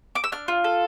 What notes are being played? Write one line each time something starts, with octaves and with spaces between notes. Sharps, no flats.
D6
E6
D4 F6
F4
A4